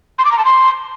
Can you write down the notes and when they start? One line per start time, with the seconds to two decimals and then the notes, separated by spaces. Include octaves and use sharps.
0.19 C6
0.25 D6
0.32 A#5
0.38 A5
0.45 C6